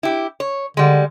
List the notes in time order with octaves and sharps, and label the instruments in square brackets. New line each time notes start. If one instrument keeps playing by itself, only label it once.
[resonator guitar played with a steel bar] E4 G4
C#5
[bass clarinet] D3 [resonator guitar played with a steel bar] G3 G#3